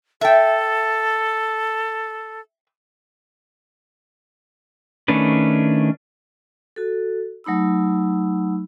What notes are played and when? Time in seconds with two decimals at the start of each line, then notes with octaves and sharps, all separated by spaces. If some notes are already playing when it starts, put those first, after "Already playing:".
0.21 A4 E5 G5
5.08 D#3 A3 C#4 D4 B4
6.76 F#4 A4
7.44 F#3 A3 D#4 B5 E6